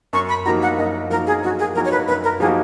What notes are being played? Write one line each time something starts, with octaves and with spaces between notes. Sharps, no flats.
F#2 C#6
B5
F3 A#3 D#4 F#4 A#5
F#5
F#2 D#5
F3 A#3 D#4 F#4 A#4
G#4
F#2 F#4
G#4
F3 A#3 D#4 F#4 A#4
C#5
B4
F#2 B4
A#4
F3 A#3 D#4 F#4 G#4